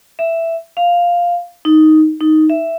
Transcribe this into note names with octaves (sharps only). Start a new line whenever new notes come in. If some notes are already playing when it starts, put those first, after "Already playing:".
E5
F5
D#4
D#4
E5